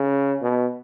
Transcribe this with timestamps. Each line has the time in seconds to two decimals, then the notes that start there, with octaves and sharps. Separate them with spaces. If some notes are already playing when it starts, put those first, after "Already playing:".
Already playing: C#3
0.42 B2